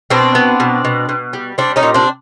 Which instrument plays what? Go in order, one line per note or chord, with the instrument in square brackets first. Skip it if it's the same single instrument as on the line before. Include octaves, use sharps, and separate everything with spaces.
[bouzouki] B2 C4 D4
B3
B2
B2
B2
G3
G3 C4 D4
C#4 D#4
A#2
C4 D4